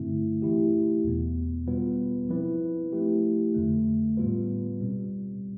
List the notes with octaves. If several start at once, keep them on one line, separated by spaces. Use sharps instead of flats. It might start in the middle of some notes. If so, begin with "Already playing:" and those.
Already playing: G2 D3 A3 C4 E4
E3 A3 E4 G4
E2 B2 B3
B2 G3 B3 F4 B4
F3 C4 E4 B4
F3 A3 E4 G4
F2 D3 A3
A2 G3 B3 F4 B4
B2 G3 C4